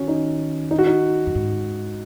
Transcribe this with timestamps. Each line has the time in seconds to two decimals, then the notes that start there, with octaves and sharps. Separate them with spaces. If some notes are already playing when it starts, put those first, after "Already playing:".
Already playing: D#3 C#4 F#4
0.08 D#4
0.71 D#4
0.79 F#4
0.87 D#4
1.27 F#2
1.35 G#2